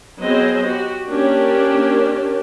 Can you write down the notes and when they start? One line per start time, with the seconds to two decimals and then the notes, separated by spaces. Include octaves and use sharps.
0.22 F#3 B3 C4 G#4 C5 D#5
0.66 F#4 G4
1.09 A#3 C#4 D4 G4 A#4